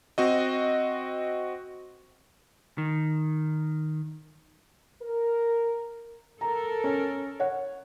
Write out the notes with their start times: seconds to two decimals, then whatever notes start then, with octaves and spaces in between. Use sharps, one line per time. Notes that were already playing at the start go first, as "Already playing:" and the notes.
0.18 C4 F#4 D#5
2.78 D#3
5.02 A#4
6.41 A4 A#4 A#5
6.84 C#4
7.40 C#5 F#5